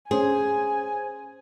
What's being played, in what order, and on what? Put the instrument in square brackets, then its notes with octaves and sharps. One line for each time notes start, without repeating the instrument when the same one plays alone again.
[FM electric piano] C#4 C5 [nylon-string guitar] G#4 [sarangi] G#5